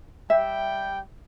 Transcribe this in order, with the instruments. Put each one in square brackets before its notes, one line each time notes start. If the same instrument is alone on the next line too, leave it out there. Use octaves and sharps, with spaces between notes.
[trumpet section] G3 G5 [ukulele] E5